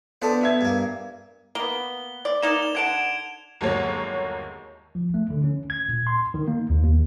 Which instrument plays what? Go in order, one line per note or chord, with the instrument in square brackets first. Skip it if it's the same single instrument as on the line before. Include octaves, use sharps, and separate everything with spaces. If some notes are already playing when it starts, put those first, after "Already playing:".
[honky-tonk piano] B3 [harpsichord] D4 A4 C5
[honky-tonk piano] B3 E5 G#6
[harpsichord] G2 A#3
[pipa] A#3 B3 [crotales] G7
[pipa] D5
[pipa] A#3 D#4 D5 [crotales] E7 F7 G7
[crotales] F7
[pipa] D3 F#5 A5 [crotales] G#6 D7
[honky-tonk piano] G1 D#2 F#3 G#3 A#3 C#5
[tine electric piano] F3
A3
D3
C#4
G#6
A#2
C6
D#3
A#3
D#2
D#2